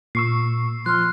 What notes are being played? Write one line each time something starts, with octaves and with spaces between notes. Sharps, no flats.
A#2 C#6 E6 C7
F3 C6 F6 F#6